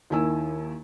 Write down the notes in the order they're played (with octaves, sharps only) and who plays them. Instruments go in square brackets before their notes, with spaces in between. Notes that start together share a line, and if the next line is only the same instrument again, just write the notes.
[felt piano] D#2 D#3 E4 G#5 E6